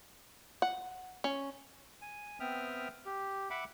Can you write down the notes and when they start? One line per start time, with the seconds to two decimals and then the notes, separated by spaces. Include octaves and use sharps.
0.62 F#5
1.24 C#4
2.02 G#5
2.40 B3 C4 E5 G5 D#6 F6
3.05 G4
3.50 E5 F#5 B5 D6